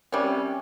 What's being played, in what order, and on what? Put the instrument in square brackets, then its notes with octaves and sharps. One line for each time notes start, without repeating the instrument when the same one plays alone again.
[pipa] C3 G3 C#4